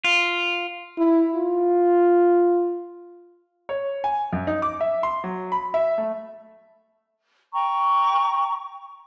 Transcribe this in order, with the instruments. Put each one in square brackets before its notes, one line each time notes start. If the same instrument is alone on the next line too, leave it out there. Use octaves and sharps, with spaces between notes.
[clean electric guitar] F4
[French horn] E4
F4
[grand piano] C#5
G#5
F#2
D#4
D6
E5
C6
F#3
B5
E5
A3
[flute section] G5 A#5 C#6